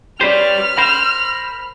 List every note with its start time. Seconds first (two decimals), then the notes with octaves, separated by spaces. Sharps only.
0.21 C#4 G4 B4 C5 D5 F6
0.78 A#4 C5 B5